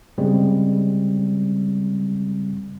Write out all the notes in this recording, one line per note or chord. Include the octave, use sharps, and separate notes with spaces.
C#3 G3 G#3 C4